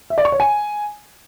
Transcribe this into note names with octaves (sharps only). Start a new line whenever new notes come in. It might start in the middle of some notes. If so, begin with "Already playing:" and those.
E5
D5
C#6
C#5
G#5